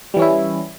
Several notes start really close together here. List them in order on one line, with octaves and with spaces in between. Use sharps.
G3 E3 C#4 E4